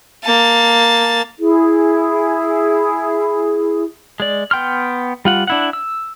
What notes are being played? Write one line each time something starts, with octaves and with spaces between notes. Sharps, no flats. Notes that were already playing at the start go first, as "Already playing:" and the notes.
A#3 A5
E4 G#4
G#3 D5
B3 G5 C6 F6
G3 F4 F#5
D4 E4 F#5
E6